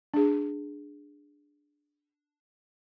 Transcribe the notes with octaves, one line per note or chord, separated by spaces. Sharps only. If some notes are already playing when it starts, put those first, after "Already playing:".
D4 G#4